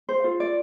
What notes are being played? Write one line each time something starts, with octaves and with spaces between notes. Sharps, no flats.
C5
F4 A4
D5